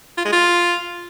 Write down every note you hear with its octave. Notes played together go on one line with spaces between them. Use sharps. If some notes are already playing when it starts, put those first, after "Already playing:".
F4
G#3
F4